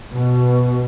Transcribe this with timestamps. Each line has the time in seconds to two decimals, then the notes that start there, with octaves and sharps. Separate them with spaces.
0.13 B2